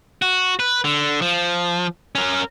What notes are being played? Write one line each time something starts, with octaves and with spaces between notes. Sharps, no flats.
F#4
B4
D3
F3
C#4 A#4